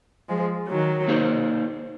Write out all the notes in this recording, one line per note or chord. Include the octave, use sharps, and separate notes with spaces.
F3 G#3
D#3 F#3
A#3 D#4 G#4 C5